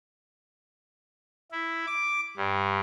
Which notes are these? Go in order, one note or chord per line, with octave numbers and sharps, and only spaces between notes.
E4
D6
G2